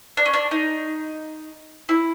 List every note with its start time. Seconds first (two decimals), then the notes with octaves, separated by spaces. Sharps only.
0.17 D4
0.26 C#4
0.34 D4
0.51 D#4
1.89 E4